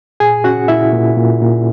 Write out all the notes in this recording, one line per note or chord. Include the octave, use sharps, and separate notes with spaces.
A#2 G#4 G#5
C#4 F#4 F#5
A#2 E4 E5
A#2
A#2
A#2